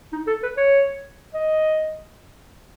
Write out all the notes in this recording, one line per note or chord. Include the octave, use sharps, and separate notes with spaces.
D#4
A4
B4
C#5
D#5